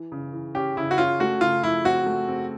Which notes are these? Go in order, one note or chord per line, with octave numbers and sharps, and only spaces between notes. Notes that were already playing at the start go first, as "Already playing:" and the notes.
Already playing: E3
C#3
E3
C#4 G4
C#3 E4
F#4
C#4 F4
A3 F#4
C#3 F4
F3 E4
C4 F#4
A3
C4